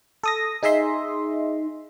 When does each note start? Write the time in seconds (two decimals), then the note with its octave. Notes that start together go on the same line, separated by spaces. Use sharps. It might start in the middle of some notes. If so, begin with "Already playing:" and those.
0.24 A4 D#6 A#6
0.63 D#4 G#4 D#5 E5 C6